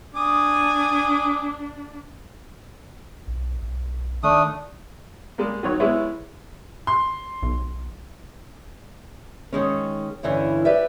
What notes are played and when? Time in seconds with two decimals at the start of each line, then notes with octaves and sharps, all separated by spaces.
0.16 D4 G#5 D6 D#6
3.27 B1
3.62 B1
4.23 D#3 A3 D4 D#6
5.38 G3 G#3 A#3
5.63 D#3 F#3 C#5
5.80 G3 G#3 B3 E4 C#5
6.87 C6
7.43 B1
9.53 D#3 G#3 C#4
10.23 G2 D3 E3 C#4 E4
10.65 G4 B4 D5 E5